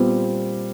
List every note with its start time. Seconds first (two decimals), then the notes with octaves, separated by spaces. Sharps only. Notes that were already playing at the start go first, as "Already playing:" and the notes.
Already playing: A#2 G3 B3 C4